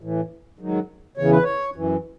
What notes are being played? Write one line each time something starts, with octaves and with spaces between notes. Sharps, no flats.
A2 E3
G#2 D#3 F#3
E2 C#3 E3 C#5
B4
C#5
F#2 E3